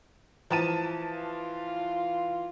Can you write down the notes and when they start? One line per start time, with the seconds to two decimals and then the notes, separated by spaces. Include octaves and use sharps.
0.50 E3 F3 A5 D#7
1.14 F4